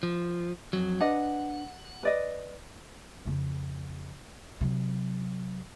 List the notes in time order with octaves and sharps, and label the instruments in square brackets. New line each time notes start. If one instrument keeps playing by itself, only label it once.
[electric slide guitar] F3
F2 F#3
[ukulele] D4 B4 D#5 [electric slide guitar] F#5
[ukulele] B4 D5 D#5
[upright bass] F2 C#3
C3 F#3